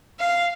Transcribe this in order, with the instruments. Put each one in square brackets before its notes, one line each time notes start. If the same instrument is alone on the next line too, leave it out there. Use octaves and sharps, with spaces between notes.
[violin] F5